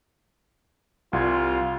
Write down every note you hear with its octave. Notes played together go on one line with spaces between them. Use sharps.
C2 G3 F4 G#6